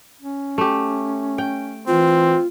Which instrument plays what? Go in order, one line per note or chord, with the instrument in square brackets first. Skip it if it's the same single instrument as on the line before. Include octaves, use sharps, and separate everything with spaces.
[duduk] C#4
[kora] A3 G4
G5
[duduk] E3 [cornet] C4 [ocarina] F4